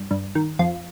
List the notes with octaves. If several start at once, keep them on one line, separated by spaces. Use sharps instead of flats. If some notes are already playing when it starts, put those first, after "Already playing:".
Already playing: G2
G2
D#3
F2 F4